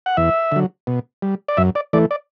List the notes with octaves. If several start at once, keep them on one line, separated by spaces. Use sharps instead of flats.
F#5
E2 E5
D3 F#3
B2
G3
D5
F#2 E5
D5
E3 A3 D5
D5